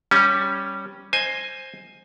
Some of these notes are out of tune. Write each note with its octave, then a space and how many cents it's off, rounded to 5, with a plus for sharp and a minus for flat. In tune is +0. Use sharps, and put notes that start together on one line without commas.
G3 +0 C#4 +0
C5 +10 D#5 +0 G#5 +0